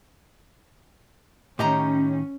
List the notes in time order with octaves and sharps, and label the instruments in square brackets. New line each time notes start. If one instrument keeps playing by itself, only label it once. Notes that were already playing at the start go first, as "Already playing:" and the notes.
[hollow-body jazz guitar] A2 D#3 [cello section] C#4 [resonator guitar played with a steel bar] G4 D#5 A#5